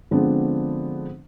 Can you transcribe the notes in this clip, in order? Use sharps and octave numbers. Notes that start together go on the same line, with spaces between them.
D3 F3 G#3 B3 C4 D4